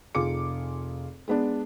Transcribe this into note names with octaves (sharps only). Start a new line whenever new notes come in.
F1 F4 G#4 D6 C#7
G#3 B3 D4